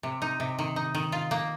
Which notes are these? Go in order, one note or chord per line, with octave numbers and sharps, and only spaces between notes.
C3
D#4
C3
D#3
D#4
D#3
F4
A#3